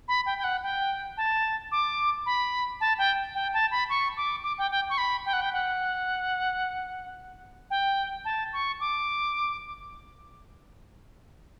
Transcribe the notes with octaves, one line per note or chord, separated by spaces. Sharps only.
B5
G5
G5
F#5
G5
A5
D6
B5
A5
G5
G5
A5
B5
C#6
D6
D6
G5
G5
C#6
B5
G5
F#5
G5
F#5
G5
A5
C#6
D6